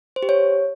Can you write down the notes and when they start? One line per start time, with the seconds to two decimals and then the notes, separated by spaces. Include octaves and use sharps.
0.16 C5
0.23 G4
0.29 C#5